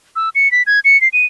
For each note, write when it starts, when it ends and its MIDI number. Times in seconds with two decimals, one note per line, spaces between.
0.16 0.29 88
0.35 0.51 97
0.51 0.63 95
0.67 0.80 92
0.84 1.00 97
1.01 1.08 96
1.13 1.26 99